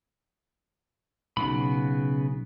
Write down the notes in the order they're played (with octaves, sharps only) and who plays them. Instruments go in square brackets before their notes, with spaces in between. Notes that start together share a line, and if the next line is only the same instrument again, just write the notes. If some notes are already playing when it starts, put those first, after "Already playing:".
[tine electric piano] B1 [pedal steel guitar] C#3 B3 B5